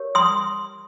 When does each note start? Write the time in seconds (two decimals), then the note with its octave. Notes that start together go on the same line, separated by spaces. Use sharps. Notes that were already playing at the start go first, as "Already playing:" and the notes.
Already playing: G4 A#4 C#5
0.15 C6 D#6